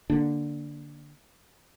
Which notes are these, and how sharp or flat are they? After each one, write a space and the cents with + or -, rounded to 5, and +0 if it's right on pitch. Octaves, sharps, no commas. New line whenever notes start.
D3 +0 A#3 +0 D4 +0